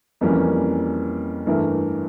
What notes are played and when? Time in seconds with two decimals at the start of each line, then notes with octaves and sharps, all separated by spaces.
0.21 F2 E3 G3 A#3 C#4
1.47 G2 E3 A3 E4 A#4